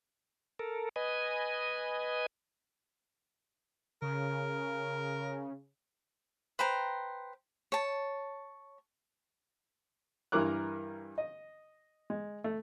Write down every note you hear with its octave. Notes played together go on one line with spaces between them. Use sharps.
A4 A#4
B4 D#5 G#5
C#3 A#4
B4 C5 G5 A#5
C#5 A5
G2 E3 E4 A#4 D6 F#6
D#5
G#3
A3